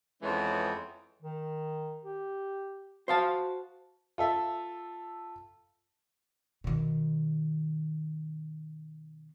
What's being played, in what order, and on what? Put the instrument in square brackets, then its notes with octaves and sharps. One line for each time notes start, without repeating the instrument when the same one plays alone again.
[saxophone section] F2 E3 G#3 B3 C#4 C#5
[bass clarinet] D#3
G4
[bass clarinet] F#4 [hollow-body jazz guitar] C5 F5 A5
[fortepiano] F4 A4 E5
[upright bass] B2 D#3